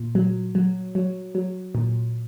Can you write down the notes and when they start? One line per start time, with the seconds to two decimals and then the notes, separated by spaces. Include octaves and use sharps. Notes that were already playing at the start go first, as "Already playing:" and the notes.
Already playing: A#2
0.15 F#3
0.55 F#3
0.95 F#3
1.35 F#3
1.75 A#2